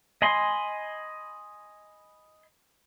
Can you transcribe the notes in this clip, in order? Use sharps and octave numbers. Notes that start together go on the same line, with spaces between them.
D#5 G#5 B5 C6